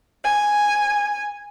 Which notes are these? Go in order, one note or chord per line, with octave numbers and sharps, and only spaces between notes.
G#5